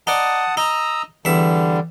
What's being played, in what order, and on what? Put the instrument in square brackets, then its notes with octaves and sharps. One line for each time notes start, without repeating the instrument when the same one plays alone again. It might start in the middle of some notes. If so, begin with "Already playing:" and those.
[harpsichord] D#4 D5 [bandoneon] F#5 A5 D#6
[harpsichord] D#4 [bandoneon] A#5 D#6 E6
[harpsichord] E2 E5 [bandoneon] D3 G3